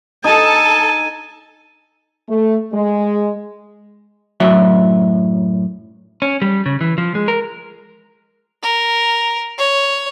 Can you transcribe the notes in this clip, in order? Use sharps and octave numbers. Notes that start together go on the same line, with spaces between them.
D#4 A4 G#5 A5
A3
G#3
F#2 A2 F#3 F#4 E5
C#4
G3
C#3
E3
F3
G#3
A#4
A#4
C#5